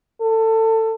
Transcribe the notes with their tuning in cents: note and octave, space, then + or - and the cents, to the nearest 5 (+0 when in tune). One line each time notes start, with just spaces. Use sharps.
A4 +20